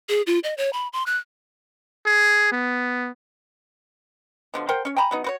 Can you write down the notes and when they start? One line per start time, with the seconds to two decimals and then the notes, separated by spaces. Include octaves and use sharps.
0.09 G#4
0.27 F4
0.44 D#5
0.57 C#5
0.73 B5
0.93 C6
1.06 F#6
2.06 G#4
2.52 B3
4.54 B2 D3 F3
4.69 A#4 C5 F#5 G5
4.85 C#4 C#5
4.97 G5 G#5 A#5 B5
5.11 F#3 B3 D#4
5.24 F#4 B4 C#5